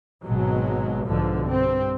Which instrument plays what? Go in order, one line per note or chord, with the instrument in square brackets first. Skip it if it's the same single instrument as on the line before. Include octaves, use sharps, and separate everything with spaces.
[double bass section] G#1 B2 F#3 G#3
B1 G#2 B2 D3 F3
G2 C4